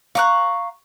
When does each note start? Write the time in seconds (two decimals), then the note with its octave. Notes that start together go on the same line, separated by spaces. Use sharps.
0.15 F5 A#5 C#6 D6 F#6